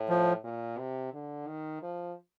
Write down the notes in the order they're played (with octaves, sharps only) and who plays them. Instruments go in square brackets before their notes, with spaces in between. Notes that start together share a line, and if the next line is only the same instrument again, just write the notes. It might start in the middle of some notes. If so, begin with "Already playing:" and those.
Already playing: [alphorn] A2
[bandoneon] F3
[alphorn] A#2
C3
D3
D#3
F3